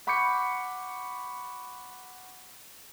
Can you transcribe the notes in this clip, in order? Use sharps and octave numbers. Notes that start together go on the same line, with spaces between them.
F#5 B5 C#6 D6 G6 C#7